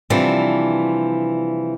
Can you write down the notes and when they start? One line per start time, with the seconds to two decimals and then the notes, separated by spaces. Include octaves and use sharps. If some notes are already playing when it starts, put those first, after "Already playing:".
0.10 C3 E3 F3 G3 D4